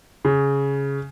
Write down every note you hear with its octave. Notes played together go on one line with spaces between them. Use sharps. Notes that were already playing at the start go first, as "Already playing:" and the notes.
C#3